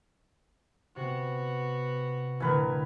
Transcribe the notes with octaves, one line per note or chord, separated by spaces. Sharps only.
C3 B3 F#4
A1 D3 A#4 B4 G#5